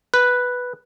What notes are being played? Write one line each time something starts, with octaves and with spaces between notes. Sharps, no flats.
B4